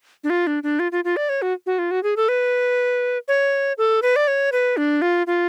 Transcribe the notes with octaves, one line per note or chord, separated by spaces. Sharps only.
D4
F4
D4
D4
F4
F4
F4
D5
C#5
F#4
F#4
F4
F#4
G#4
A4
B4
C#5
A4
B4
D5
C#5
B4
D4
F4
F4